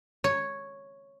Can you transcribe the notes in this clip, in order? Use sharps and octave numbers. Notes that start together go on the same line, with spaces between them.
C#5